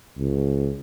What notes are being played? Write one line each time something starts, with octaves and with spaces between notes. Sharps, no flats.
C#2